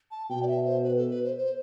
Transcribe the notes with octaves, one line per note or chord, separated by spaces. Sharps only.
A5
B2 G5
D5
E5
C5
B4
A4
B4
C5
C5